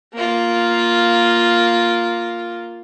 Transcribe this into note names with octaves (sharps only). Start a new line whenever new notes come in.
A#3 F4